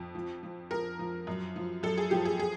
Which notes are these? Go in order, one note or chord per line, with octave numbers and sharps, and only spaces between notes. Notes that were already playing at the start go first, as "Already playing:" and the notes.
Already playing: F2
F3
F3
F3 A#4
F3
F#2
F3
F#2 A4
G#4
F3 G4
G#4
G#4